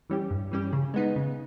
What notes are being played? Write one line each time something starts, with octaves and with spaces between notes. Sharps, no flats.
E3 G3 C#4 G4
G2
E3 G3 C#4 G4
C#3
G#3 B3 D#4
C#3